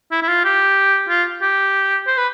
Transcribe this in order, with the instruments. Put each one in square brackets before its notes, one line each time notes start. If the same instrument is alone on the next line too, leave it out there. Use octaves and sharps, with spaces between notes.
[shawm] E4
E4
F4
G4
F4
G4
C5
B4